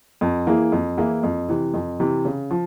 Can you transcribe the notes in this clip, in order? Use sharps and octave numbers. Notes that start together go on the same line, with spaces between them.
F2
E3 A#3 E4 G#4
F2
E3 A#3 E4 G#4
F2
C3 E3
F2
C3 E3
C#3
F3